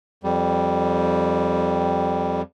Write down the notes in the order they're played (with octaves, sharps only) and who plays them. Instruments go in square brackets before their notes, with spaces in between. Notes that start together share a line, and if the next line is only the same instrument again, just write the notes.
[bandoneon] F2 G3